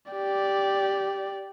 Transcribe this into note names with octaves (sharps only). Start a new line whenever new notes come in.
G4 D5